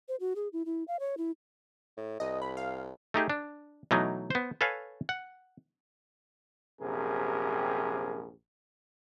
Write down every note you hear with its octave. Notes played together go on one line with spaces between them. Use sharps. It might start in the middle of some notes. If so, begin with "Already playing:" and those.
C5
F#4
G#4
E4
E4
F5
C#5
E4
A2
C2 D#5
B5
F5
A3 D#4 G4 G#4
D4
B2 E3 F#3 A3 D#4
B3 C5
A4 B4 C#5 F5 G#5
F#5
A#1 F#2 C3 G4 G#4 A#4